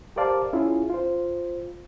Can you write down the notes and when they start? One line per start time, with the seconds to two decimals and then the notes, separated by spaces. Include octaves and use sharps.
0.16 G4 A#4 C5 D5 F5 A5
0.53 C#4 E4 F4 G#4
0.90 F4 C5